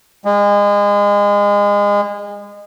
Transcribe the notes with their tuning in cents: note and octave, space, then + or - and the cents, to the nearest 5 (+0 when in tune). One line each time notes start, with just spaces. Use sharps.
G#3 -30